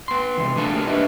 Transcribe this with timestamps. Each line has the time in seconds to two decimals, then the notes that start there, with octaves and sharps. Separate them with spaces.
0.08 B3 C6
0.38 C3 E3
0.56 B2 A3 D4 F5 G#5 A5
0.73 A#3 G4 A#4
0.87 D4 E4 G4 B4 D#5